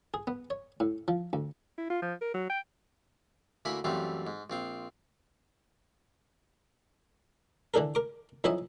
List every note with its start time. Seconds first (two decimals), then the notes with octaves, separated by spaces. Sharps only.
0.14 G#4
0.27 B3
0.50 C#5
0.80 A2
1.08 F3
1.33 D2
1.78 E4
1.90 F4
2.02 F3
2.21 A#4
2.34 F#3
2.49 G5
3.65 D2 A#3 E4 G#5 B5
3.84 F#2 E3 G3 A3 C4 F4
4.27 G#2
4.50 A#1 C4 F4
7.74 D3 E3 D4 A4 A#4
7.95 A#4 D6
8.44 F2 E3 F#3 E4 D#5 E5